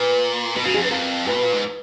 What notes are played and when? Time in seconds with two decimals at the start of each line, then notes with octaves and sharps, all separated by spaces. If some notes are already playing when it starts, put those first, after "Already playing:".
Already playing: A#2 B4
0.56 B2 A#4
0.64 C#3 F#4
0.74 F2 G#4
0.82 F#2 B4
0.91 F2 A#4
1.27 B4
1.32 B2
1.42 A#2
1.52 G#2